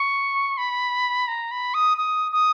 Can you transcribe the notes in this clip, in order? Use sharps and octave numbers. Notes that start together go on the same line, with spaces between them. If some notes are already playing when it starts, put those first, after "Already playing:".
Already playing: C#6
B5
A#5
B5
D#6
D#6
D#6